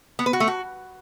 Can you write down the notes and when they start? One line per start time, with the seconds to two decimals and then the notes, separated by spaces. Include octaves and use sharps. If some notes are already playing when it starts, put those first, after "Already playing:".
0.19 B3
0.26 B4
0.33 F#4
0.40 A3
0.48 F#4